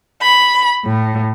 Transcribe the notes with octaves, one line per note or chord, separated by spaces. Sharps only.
B5
A2